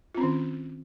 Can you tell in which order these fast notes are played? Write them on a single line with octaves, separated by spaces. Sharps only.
F4 C4 C#4 D#3